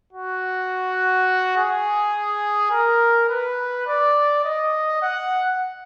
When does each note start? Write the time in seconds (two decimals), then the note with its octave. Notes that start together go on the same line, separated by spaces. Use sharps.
0.13 F#4
1.57 G#4
2.71 A#4
3.29 B4
3.87 D5
4.45 D#5
5.02 F#5